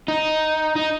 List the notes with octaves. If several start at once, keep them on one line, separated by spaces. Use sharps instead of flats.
D#4
D#4